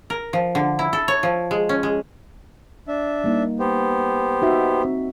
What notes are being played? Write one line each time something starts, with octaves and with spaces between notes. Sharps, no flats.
A#4
F3
D3
E4
A4
C#5
F3
G#3
C#4
G#3
D4 E5
G3 A#3 D#4
B3 G4 C5
D#4 F#4 E5
C4